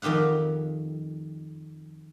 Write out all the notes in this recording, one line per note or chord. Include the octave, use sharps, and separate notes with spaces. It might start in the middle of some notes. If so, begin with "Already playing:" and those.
F2 D#3 G4 F5 F#5